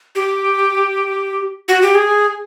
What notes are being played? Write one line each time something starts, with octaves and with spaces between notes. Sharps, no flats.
G4
F#4
G4
G#4